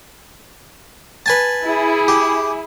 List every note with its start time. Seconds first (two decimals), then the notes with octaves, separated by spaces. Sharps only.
1.26 B4 G#5 A5
1.64 E4 G#4
2.08 G4